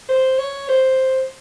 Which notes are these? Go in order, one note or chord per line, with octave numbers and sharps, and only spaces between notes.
C5
C#5
C5